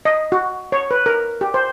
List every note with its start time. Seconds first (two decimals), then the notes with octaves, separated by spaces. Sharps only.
0.05 D#5
0.32 F#4
0.72 C#5
0.91 B4
1.06 A#4
1.41 G4
1.54 C5